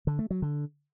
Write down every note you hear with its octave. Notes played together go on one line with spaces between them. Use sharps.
D3
A3
F#3
D3